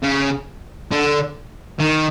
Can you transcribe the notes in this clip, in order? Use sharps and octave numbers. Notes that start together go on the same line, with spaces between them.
C#3
D3
D#3